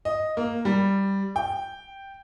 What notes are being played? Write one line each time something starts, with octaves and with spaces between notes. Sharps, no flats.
D#5
A#3
G3
G5